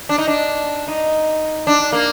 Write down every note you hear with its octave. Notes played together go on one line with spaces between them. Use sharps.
D4
D#4
D4
D#4
D4
A#3